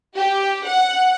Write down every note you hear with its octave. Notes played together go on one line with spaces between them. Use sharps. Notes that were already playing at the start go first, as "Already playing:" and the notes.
G4
F#5